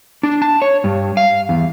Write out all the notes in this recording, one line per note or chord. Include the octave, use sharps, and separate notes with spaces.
D4
A5
C#5
G2
F5
E2